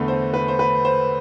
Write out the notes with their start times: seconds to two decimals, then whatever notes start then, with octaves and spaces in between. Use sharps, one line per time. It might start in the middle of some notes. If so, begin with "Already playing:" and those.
Already playing: E2 D3 A3 B4
0.08 C5
0.34 B4
0.48 C5
0.59 B4
0.85 C5